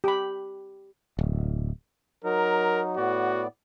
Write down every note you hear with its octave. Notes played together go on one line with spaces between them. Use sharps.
G4 B5
D1
F#3 D#4 A#4
A2 B3 F#4 D5